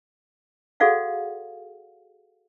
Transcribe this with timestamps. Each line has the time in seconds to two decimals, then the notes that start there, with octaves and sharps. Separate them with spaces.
0.80 F#4 G#4 A4 D5 F5 F#5